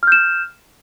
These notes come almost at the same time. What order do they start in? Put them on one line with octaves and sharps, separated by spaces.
F6 G6 E7